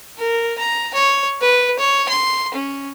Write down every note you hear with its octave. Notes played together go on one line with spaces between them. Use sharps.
A#4
A#5
C#5
B4
C#5
C6
C#4